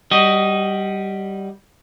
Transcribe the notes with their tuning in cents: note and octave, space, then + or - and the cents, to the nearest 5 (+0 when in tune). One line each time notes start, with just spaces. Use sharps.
G3 -5 F#4 +25 D#5 +0